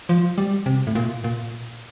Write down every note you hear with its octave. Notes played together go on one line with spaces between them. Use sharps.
F3
G3
C3
A2
A#2
A#2